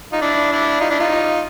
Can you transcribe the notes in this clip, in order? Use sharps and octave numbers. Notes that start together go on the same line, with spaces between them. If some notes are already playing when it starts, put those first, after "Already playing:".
D#4 F4
D4 E4
D4 E4
D#4 F4
D4 E4
D#4 F4